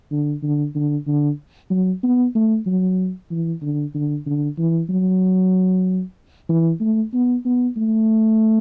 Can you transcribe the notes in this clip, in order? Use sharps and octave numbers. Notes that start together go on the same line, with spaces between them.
D3
D3
D3
D3
F#3
B3
A3
F#3
E3
D3
D3
D3
E3
F#3
E3
A3
B3
B3
A3